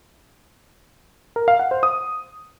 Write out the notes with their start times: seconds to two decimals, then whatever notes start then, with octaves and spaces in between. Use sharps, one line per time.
1.36 A#4
1.48 F5
1.59 F#5
1.71 C5
1.83 D#6